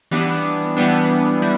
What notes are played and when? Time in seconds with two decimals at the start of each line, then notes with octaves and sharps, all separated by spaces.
0.11 E3 G3 B3 D4
0.77 E3 G3 B3 D4
1.42 E3 G3